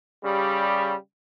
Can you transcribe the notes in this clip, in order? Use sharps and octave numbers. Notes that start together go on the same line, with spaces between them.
C#3 G3